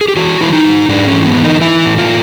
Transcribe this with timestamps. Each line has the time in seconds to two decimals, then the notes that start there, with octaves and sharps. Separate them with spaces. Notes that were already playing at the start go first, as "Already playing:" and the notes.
0.01 G#4
0.08 G4
0.16 E3 F#4
0.41 E3 E4
0.53 D#4
0.64 G#2
0.89 G#2 D4
1.07 C#4
1.13 E3
1.25 B3
1.37 E3
1.44 D#4
1.61 E3 E4
1.86 A2
1.98 F4